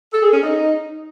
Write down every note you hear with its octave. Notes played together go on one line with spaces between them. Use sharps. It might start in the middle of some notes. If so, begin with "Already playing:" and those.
A4
G#4
C#4
D#4